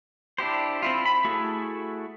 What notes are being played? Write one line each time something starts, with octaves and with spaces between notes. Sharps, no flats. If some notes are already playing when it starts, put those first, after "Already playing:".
D4 E4 G4 C5
C4 E4 F4
B5
A3 E4 F#4 G#4 A4